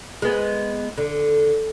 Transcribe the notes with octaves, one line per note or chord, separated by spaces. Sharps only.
G#3 B3
D3